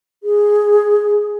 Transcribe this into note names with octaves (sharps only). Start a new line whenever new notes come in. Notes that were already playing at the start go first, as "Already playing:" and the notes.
G#4